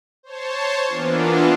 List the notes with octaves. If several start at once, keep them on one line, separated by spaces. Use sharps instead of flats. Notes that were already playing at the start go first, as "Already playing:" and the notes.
C5 C#5 A5
E3 A#3 B3 D4 F4